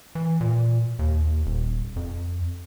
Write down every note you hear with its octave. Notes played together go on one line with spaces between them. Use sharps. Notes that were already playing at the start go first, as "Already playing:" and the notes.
E3
A#2
D#2
D#1
F2